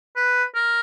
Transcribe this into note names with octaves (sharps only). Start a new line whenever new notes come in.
B4
A#4